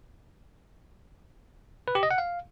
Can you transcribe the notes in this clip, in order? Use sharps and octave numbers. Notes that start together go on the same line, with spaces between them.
B4
G4
D#5
F#5
F5